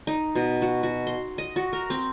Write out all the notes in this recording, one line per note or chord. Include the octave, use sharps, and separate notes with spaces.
D#4
B2
F#4
F#4
C6
D#5
F#4
A#4
C4